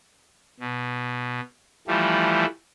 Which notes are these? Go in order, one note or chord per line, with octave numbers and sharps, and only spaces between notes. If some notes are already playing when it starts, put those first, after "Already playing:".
B2
E3 F3 G3 A3